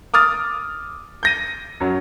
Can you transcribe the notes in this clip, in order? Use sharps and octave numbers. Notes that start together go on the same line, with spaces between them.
D6 D#6 F6 A6
G6 A#6 D#7
F#2 F#3